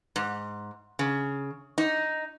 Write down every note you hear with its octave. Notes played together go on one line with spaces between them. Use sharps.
G#2
C#3
D#4